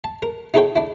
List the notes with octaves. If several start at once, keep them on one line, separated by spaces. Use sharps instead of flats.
A5
A#4
D#4 E4 G#4 A4 C#5 G5
D4 E4